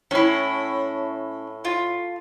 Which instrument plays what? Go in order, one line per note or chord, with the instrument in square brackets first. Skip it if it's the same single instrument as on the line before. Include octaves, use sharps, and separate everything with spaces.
[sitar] A2 [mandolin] C#4 E4
[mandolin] F4